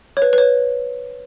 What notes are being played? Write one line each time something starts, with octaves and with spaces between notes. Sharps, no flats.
C#5
B4
B4
C#5